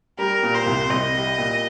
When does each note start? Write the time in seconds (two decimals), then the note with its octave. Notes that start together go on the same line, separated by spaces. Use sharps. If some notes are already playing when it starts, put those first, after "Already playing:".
0.19 G3 A#4
0.43 A#2
0.55 C5
0.66 C2
0.90 C2 D#5
1.15 G3
1.38 A#2